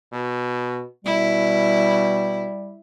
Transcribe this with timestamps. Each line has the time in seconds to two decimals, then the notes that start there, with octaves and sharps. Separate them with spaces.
0.12 B2
1.05 B2 G3 E4